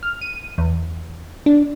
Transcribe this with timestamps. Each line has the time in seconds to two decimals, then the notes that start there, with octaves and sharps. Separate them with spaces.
0.03 F6
0.21 D#7
0.58 E2
1.46 D4